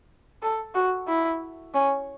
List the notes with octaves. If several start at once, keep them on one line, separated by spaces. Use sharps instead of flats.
A4
F#4
E4
C#4